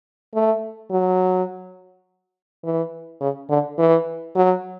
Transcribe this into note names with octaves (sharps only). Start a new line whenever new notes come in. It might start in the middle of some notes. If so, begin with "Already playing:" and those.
A3
F#3
E3
C#3
D3
E3
F#3